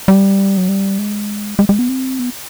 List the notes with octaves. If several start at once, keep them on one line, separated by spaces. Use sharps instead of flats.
G3
F#3
G3
G#3
G#3
G#3
B3
C4
B3